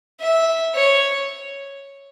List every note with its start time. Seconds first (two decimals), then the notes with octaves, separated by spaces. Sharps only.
0.21 E5
0.75 C#5